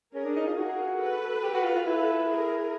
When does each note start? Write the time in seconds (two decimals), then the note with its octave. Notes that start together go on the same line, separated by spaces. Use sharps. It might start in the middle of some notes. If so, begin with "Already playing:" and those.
0.14 C#4 G#4 A#4
0.25 D4
0.36 D#4
0.47 F4
0.57 F#4 G#4 A#4
1.00 A4 B4
1.43 G4
1.54 F#4
1.64 F4
1.75 F4
1.85 E4 A4 B4
2.28 G#4 A#4